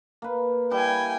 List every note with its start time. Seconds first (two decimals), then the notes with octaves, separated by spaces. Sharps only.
0.22 A#3 B4
0.71 G3 E4 G5 G#5